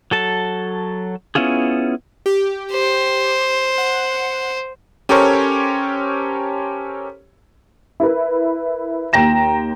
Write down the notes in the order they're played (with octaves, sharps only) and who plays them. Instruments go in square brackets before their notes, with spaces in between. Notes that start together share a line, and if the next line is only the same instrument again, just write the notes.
[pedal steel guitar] F#3 A4 A5
B3 C#4 E4 F4 G#4
[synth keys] G4
[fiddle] C5
[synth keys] F#5
[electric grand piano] C#4 G4 A4 A#4 C5 C#5
[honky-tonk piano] E4 A#4 B4
D#2 G5 A#5 A#6 E7